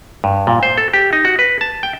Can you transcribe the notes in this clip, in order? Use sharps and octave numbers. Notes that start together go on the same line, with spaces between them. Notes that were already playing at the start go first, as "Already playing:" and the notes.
G2
A#2
C5
A4
G4
D#4
F#4
B4
A5
G5